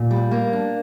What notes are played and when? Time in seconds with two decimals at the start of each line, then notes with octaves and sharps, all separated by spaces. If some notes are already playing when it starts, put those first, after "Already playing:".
Already playing: A#2
0.11 G3
0.31 A#3
0.53 D4